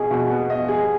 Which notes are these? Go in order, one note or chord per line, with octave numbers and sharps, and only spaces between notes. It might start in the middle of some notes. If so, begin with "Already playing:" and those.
Already playing: B2 G#4 D#5
B2
B3
D#5
G#4